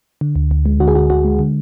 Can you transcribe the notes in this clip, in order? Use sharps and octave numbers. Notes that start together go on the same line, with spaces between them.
D3
D2
D2
G#3
D3 F#4
G#4
D2 F#4
D2 F#4
G#3
D3